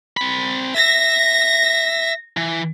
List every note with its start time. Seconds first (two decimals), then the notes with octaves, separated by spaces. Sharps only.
0.17 C4 B5
0.74 E5 A#6
2.37 E3